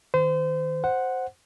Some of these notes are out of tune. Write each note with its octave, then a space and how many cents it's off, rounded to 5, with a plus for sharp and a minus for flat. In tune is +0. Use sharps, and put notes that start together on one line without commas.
D#3 +0 C5 -30
C5 +0 F#5 +0